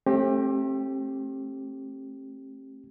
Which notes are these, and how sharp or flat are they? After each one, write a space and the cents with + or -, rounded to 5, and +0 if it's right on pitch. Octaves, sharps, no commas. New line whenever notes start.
A3 +0 C4 +40 G4 +0